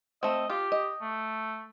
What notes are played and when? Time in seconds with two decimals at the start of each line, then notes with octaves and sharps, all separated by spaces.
0.23 A3 C4 D#5
0.50 F4 G4
0.72 D#5
1.01 A3